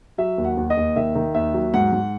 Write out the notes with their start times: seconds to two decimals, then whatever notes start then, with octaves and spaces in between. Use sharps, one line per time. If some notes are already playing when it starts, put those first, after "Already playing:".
0.18 F#3 E5
0.38 D#2
0.44 F#5
0.57 D#2
0.70 D#5
0.77 D#2
0.96 D#3 E5
1.15 D#3
1.34 D#2 E5
1.54 F#3
1.74 G#2 F#5
1.93 G#2